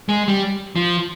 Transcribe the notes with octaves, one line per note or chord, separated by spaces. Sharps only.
G#3
G3
F3